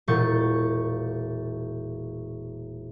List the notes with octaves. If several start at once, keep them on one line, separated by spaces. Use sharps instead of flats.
E1 A#2 C#6 G6 A6